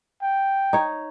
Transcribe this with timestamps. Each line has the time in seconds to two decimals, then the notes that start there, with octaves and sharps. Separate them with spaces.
0.22 G5
0.73 D#4 C#5